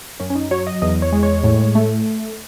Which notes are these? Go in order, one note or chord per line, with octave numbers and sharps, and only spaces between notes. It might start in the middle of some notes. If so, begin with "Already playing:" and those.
F#2 C#4
C#4
D#4
F#3 C#5
D#5
E2 D#5
C#5
G#3
C#5
A2
A3